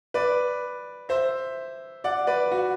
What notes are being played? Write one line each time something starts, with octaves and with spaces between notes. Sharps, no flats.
B4 D5
C5 E5
D5 F#5
B4 D5
F#4